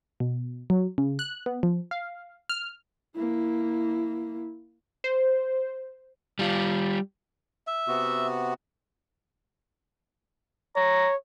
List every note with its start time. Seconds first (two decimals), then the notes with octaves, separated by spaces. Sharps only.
0.20 B2
0.70 F#3
0.98 C#3
1.19 F#6
1.46 B3
1.63 F3
1.91 F5
2.50 F6
3.16 A#3 E4
5.04 C5
6.39 G3 F4
7.67 E5
7.88 C3 B3 F#4
10.76 C#5 A#5